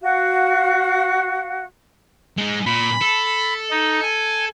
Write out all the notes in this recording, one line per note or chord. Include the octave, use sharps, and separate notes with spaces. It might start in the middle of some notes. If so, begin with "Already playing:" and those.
F#4 F5
G#3 D#4
A#2 B5
A4
D#4
G#5